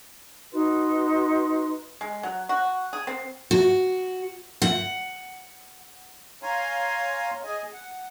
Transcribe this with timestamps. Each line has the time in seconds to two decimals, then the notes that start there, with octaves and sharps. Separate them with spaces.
0.52 D#4 F#4 B4 C6
2.01 G#3
2.23 F#3
2.49 F#4
2.93 G#4
3.07 C4
3.51 F#4
4.62 F#5
6.43 C#5 F5 G#5 A#5 C6
7.44 G#4 D#5 G#5
7.74 F#5